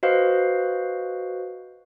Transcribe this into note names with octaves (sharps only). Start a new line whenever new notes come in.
F#4 B4 C5 D#5 F5